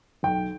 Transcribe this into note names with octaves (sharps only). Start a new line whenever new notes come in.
B1 G5